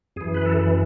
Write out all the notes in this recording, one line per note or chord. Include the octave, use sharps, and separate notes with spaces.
F#2 E3 G#4
B4
A4